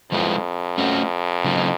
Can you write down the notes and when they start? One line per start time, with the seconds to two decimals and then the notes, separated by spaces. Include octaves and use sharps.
0.12 F2 F3 G#3 B3 E4
0.78 A3 C#4 F#4
1.44 C#3 F#3 A#3 D#4